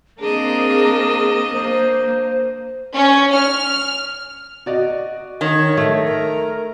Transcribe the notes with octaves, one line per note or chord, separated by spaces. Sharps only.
A#3 C4 D4 G#4 A#4 D#5
A#3 C5
C#4
F6
F#4 D5 D#5
D#3 C#5
A3
A#4